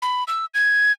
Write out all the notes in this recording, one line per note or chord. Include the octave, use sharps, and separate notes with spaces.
B5
E6
G#6